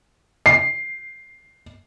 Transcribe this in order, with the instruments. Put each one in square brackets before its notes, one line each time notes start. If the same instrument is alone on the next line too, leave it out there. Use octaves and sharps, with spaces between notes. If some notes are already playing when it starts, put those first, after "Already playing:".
[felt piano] C7